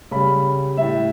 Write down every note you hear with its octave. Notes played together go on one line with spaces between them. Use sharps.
C#3 G3 B5
A2 G3 E5